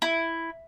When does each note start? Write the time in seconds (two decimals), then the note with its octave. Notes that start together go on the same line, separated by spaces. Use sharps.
0.02 E4